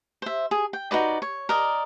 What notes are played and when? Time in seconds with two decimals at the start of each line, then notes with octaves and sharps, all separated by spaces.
0.22 C5 E5
0.51 G#4
0.73 G5
0.91 D#4 F#4 B4 D5
1.22 C#5
1.49 A#4 D5 D#5